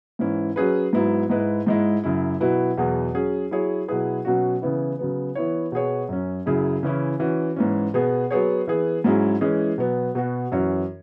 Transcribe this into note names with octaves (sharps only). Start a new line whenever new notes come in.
G#2 E3 C#4 E4
F#3 C#4 G#4 B4
G#2 F#3 B3 E4
G#2 G#3 E4 B4
G#2 G#3 E4
F#2 C#3 F#3 E4
B2 F#3 E4 B4
E2 B2 F#3 B3 G#4
F#3 C#4 G#4
F#3 E4 G#4 C#5
B2 F#3 E4 G#4 B4
B2 F#3 C#4 F#4
C#3 E3 B3 E4
C#3 F#3 B3
E3 B3 E4 C#5
B2 B3 G#4 C#5
F#2 F#3 C#4
F#2 C#3 F#3 E4 G#4
C#3 E3 C#4 E4
E3 C#4 F#4
G#2 E3 C#4
B2 B3 G#4
F#3 B3 G#4 C#5
E3 B3 G#4
G#2 F#3 C#4 E4 G#4
E3 G#3 C#4 E4 G#4
B2 F#3 B3
B2 B3 F#4
F#2 E3 C#4 F#4 C#5